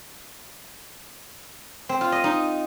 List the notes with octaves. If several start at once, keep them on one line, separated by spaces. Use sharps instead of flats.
C4
F4
D#5
D#4